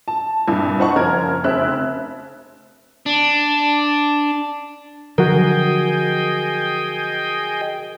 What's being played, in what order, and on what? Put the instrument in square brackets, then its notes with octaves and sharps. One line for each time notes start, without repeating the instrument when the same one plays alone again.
[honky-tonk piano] A5
C2 G2 A#2
D4 C5 D#5 F#5 A5 C#6
F#1 F3 C#4 A#4 F6 G#6
F1 C#3 C4 E5 F#6
[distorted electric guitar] D4
[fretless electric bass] D3 F3 F#3 [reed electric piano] F#4 A#4 [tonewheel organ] G#4 D#5 G5